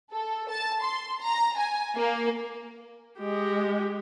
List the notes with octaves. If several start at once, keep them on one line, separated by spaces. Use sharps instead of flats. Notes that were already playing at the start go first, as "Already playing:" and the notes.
A4
A5
C6
A#5
G#5
A#3
G#3 G4